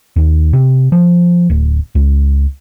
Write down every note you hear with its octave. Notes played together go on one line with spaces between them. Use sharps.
D#2
C3
F3
D1
C#2